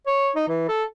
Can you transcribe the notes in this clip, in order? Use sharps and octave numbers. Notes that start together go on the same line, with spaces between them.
C#5
D#4
E3
A4